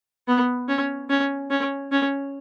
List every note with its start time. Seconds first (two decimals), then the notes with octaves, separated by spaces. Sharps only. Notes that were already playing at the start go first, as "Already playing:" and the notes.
0.28 B3
0.68 C#4
1.10 C#4
1.50 C#4
1.92 C#4